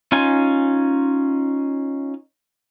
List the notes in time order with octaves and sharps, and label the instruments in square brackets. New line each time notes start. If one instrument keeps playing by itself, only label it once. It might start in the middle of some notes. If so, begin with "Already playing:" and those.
[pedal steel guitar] C#4 D#4 F4 G#5